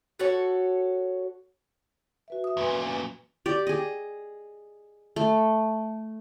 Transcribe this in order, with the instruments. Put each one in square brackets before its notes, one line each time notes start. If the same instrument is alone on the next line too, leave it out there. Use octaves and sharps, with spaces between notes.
[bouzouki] F#4 A4 C#5 F#5
[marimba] F#4 B4 E5
E5 D#6
[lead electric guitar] F#2 A#2 [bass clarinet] E3
[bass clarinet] E3
[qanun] G4 D5
G#4 D#5
A3